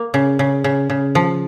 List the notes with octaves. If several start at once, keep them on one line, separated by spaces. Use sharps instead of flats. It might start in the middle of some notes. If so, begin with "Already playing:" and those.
Already playing: A#3
C#3
C#3
C#3
C#3
F3